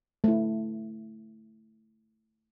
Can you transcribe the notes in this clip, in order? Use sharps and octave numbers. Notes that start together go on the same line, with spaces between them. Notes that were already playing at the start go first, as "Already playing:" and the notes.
A3 E4